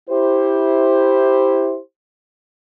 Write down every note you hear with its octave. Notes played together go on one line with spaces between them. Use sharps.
E4 G4 C5